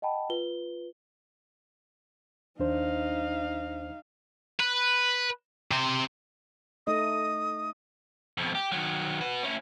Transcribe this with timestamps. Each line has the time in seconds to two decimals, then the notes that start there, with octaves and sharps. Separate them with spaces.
0.02 D#5 F#5 G5 A5 B5
0.30 F4 B4 G7
2.59 D#2 D4 D#4 C5 F5
4.60 B4
5.71 C3 C5
6.87 A3 D#4 D#5 D#6
8.38 F2 B2
8.55 G4
8.72 D#3 F#3
9.21 F#4 B4
9.43 C#4 E4